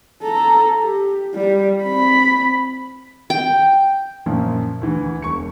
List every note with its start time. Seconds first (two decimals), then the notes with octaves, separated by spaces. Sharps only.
0.22 A4 A#5
0.81 G4
1.34 G3
1.83 C4 B5
3.30 G5
4.26 F#2 A#2 F3
4.82 D2 E3
5.22 E1 C#6 C#7